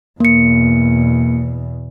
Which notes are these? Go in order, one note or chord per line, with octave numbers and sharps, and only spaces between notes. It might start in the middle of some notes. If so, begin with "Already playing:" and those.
E2 B2 A#3 C#7